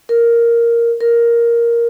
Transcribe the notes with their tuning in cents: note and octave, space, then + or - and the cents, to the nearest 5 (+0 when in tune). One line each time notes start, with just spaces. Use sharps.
A#4 +0
A#4 +5